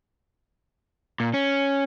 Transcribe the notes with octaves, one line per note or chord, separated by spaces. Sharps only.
A#2
C#4